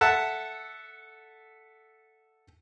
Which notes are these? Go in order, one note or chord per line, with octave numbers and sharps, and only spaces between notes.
A4 E5 F#5 A5